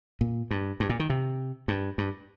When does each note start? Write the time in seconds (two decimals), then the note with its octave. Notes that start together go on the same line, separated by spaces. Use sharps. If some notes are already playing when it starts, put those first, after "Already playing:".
0.21 A#2
0.51 G2
0.80 G2
0.89 A#2
1.00 D#3
1.10 C3
1.68 G2
1.98 G2